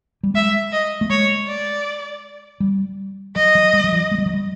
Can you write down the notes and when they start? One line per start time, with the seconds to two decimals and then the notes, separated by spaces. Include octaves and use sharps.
0.23 G3
0.34 G#3 E5
0.72 D#5
1.01 A3
1.10 G#3 C#5
1.47 D5
2.60 G3
3.36 F#3 D#5
3.55 F#3
3.74 G3
3.84 F#3
3.92 F3
4.11 G#3
4.18 G3
4.26 F#3
4.33 G3